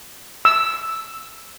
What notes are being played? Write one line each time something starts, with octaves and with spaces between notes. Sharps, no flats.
E6